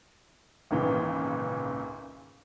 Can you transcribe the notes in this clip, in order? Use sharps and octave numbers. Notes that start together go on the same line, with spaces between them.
G#1 C#2 A#2 C#3 E3